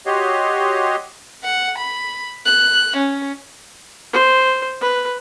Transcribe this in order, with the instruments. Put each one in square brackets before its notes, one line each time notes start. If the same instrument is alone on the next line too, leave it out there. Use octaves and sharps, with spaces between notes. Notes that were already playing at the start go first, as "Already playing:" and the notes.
[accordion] F#4 G4 C#5 D#5 C6
[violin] F#5
B5
F#6
C#4
[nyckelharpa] C5
B4